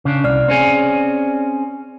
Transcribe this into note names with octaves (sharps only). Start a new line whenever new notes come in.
C#3 D4
C2 D5 F6
C4 C#4 G#4